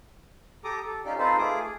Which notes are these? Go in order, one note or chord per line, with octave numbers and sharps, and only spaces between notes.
G4 A4 A#5 D6 D#6
A4
C#4 D#4 F4 G4 D5
C4 D#4 F4 A4 B4 C5
A3 F4 G#4 D6 D#6
G#4